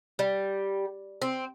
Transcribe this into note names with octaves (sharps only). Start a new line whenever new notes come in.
G3
C4